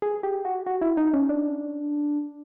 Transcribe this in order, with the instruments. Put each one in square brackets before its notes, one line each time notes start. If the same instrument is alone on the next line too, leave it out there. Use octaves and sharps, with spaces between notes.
[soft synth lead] G#4
G4
F#4
F#4
E4
D#4
C#4
D4